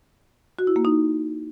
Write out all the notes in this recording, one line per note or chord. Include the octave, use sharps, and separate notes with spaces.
F#4
E4
A#3
D#4